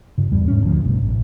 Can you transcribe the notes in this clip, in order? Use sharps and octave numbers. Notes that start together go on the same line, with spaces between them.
G2 C#3
A1 E2 G3
G#2 G3 C#4
D2 F3
F#1 B1 G2 B2
A1